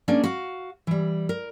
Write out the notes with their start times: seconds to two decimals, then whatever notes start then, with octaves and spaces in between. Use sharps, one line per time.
0.08 A#3 C#4 D4 G#4
0.24 F#4 F5
0.87 E3 G3
1.29 A#4